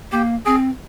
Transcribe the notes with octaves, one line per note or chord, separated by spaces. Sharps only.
A#3 G4
C4 G#4